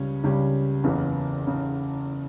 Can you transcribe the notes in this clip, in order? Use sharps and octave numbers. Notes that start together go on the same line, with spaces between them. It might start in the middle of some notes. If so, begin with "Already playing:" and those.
Already playing: C#2 C#3 G3 C#4
C#2 C#3 G3 C#4
F#1 E2 C#3 E3
C#3